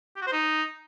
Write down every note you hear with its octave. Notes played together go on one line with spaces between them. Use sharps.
G4
F#4
C5
D#4